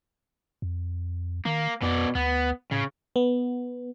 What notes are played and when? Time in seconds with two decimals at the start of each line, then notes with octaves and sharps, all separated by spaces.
0.62 F2
1.45 D#3 A#3
1.82 F2 B2 B3 D5
2.15 D2 B3
2.71 A2 C#3
3.16 B3